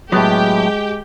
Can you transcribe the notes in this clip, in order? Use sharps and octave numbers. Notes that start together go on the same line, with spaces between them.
A2 F#3 G#3 B3 G4 G5